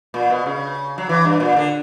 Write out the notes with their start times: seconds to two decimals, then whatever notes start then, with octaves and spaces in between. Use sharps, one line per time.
0.14 A#2
0.30 B2
0.46 C#3
0.98 F#3
1.09 E3
1.25 G2
1.40 A#2
1.57 D3